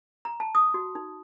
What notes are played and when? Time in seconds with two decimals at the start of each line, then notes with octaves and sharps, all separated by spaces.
0.25 A#5
0.40 A5
0.55 D#6
0.74 F#4
0.95 D#4